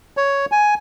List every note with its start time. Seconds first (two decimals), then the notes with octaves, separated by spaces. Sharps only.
0.17 C#5
0.52 G#5